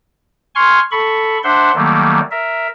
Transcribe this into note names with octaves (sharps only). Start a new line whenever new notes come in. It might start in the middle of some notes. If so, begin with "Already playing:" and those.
G#5 C6 C#6 F6
A4 B5 C#6
D4 C5 E5 F#5 C6
D#3 F#3 G3 A3 A#3
A#4 E5